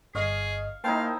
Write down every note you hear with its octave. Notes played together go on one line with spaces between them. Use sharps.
G1 G#4 D#5 F5 C#6
A#3 D#4 E4 C5 F5 G5 A5